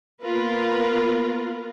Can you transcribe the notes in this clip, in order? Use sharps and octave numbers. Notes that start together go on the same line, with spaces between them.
A#3 B3 F4 A#4 B4